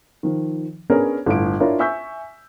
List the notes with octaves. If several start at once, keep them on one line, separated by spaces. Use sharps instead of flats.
D#3 F3
B3 C#4 D4 G#4 A#4 C#5
G1 A2 D7
D4 E4 F4 A#4 C#5
E5 G#5 C#6 E6 G6 B6